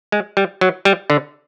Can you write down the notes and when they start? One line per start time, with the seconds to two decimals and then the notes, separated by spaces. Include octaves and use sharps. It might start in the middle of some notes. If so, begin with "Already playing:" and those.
0.12 G#3
0.37 G3
0.61 F#3
0.85 G3
1.10 D3